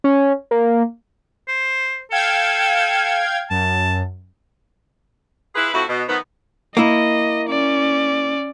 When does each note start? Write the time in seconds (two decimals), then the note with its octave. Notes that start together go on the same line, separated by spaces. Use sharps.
0.04 C#4
0.51 A#3
1.48 C5
2.12 A4 F5 G5 G#6
3.50 F#2 A5
5.55 E4 F4 G#4 B4
5.73 F2 A3 E4 F#4
5.88 B2
6.08 D#3 F3 A3 B3
6.77 A#3 E4 D#5
7.49 C#4 D5